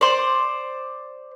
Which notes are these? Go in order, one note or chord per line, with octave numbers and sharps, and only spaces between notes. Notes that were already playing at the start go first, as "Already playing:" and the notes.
C5 D5